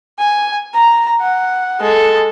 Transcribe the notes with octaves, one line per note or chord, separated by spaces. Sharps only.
G#5
A#5
F#5
G#3 A4